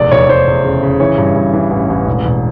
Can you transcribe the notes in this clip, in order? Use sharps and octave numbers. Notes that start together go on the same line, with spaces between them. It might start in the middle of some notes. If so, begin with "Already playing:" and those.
Already playing: F1 E2 D5
F1 C#5
F1 C5
E2
C#3
C#3
E3 C#5
G2
G2
E3
A1
A1
E1
E1